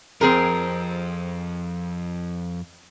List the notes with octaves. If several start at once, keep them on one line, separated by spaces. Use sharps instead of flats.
F2 C4 G#4 A#4